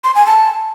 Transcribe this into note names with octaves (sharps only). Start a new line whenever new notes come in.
C6
G#5
A5